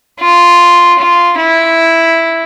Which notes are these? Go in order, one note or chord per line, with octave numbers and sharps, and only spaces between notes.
F4
F4
E4